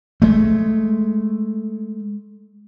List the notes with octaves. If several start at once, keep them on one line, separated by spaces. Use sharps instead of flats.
G#3 A3